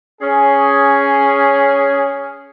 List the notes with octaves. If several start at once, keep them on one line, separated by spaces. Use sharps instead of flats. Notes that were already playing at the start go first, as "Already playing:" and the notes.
C#4 G#4